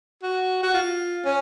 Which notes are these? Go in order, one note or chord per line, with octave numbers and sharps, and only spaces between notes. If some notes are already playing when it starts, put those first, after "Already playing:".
F#4
F#4
F4
C#4